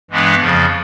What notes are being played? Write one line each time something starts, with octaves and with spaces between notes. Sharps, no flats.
G2 E3 G#3 B3 D4
F2 C#3 F3